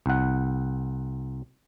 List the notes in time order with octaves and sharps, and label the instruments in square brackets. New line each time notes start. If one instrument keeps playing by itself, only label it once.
[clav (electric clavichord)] C2 F#5